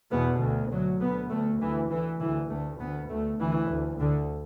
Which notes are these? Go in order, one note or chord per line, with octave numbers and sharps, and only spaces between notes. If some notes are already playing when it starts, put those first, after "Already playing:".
E2 B2 B3
D2
D2 F#3
D2 B3
D2 A3
D2 E3
D2 E3
D2 E3
D2 A3
D2 B3
D2 A3
D2 E3
D2
D2 D3